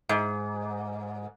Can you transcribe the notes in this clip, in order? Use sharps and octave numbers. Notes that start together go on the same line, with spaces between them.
G#2